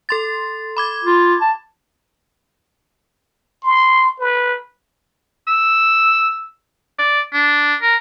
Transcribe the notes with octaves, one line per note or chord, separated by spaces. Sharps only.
A4 C6 A6
B5 D6 G#6
F4
A5
C6
B4
E6
D5
D4
A#4